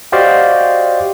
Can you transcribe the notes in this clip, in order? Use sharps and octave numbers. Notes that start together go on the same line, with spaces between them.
F#4 G4 C5 D5 D#5 F5